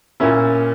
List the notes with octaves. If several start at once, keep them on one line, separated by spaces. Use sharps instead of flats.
A#2 A#3 C#4 E4